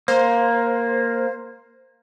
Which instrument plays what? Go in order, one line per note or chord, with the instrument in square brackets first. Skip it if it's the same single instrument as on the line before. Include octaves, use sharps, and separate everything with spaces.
[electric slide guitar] A#3 [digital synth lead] C5